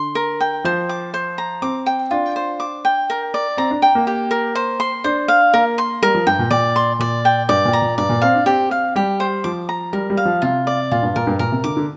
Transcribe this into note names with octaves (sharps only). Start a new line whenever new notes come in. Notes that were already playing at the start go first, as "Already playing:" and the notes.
Already playing: D3 C6
A#4
G5
F3 C5
D6
C5
A#5
C4 D6
G5
D4 F4
C5
D6
G5
A#4
D5
C4 A#5
D4
G5
A#3
G4
A#4
C5
C6
D4 C5
F5
A#3 A#4
C6
G3 A#4
F3
G2 G5
A#2
A#2 D5
C6
A#2 D5
G5
G2 D5
A#2
A#5
A#2
G2 D5
A#2
C4 F5
D4
C4 G4
F5
G3 G4
C5
F3 D6
A#5
G3 A#4
G3
F5
F3
C3 F4
D5
A#2 F4
G2
A#2 A#4
G2
A#2 A#4
C3
D3 D6
D3